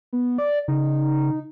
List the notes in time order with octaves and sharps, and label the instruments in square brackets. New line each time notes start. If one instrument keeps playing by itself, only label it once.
[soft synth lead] B3
D5
[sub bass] C#3 [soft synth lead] D#4